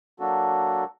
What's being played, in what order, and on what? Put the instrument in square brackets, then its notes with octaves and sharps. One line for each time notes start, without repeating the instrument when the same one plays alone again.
[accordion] F#3 A#3 D4 F#4 A4